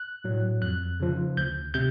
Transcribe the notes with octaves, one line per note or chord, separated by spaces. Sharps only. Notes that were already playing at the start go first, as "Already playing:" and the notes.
Already playing: F#6
A2 F#3
F2 F#6
C#3 F3
D2 G6
C3 G6